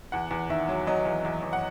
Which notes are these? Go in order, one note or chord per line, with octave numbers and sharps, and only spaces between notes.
E2 F#5
E2
D#3 E5
F#3
F#3 D#5
E2
E2
E2
F#5